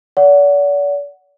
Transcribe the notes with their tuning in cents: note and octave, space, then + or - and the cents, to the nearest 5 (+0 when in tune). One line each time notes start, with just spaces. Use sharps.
D5 -40 F#5 +0